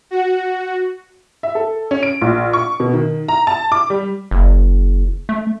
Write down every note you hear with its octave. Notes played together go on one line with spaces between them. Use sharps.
F#4
E5
A4
C#4
D7
A#1
C#6
B2
D#3
A#5
A5
D6
G3
F#1
A3